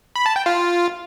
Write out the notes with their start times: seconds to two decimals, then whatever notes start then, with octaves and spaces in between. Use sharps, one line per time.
0.16 B5
0.26 A5
0.36 G5
0.46 F4